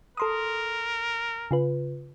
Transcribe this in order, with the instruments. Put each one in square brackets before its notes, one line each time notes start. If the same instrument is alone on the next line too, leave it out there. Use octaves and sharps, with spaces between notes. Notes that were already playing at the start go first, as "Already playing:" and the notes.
[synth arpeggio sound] A4 C6 D#6 [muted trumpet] A#4
[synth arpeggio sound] C#3 F4 B4